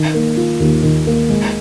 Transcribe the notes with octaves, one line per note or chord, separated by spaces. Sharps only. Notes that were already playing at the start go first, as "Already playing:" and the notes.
Already playing: D#3
A#3
F4
D#2
D#3
A#3
G#3